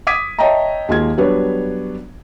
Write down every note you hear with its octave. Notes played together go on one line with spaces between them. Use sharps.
D6 D#6 G#6 B6 D#7
C#5 D#5 E5 G5 A5 A#5
D#2 G#3 A#3 F4 G#6
F#3 G3 B3 D4 B4 C#5